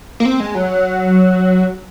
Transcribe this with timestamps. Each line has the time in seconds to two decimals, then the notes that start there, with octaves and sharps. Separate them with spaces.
0.20 A#3
0.25 C4
0.40 G#3
0.55 F#3